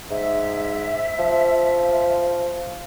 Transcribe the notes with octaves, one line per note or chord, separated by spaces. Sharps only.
G#2 E5
F3